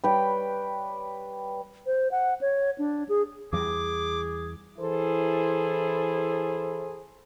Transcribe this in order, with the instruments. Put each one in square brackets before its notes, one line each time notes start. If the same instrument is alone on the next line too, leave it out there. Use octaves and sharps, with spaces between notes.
[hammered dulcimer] G3 B4 C#5 G5
[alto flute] C5
F#5
C#5
D4
G#4
[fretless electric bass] E2 E3 G3 [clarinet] G#4 [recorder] D6
[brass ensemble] E3 E4 G#4 A4 C5